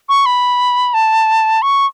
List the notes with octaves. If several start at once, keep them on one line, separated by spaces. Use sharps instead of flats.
C#6
B5
A5
C#6